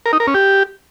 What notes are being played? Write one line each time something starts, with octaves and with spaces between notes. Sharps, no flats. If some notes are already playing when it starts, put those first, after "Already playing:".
A#4
D#4
A#4
C#4
G4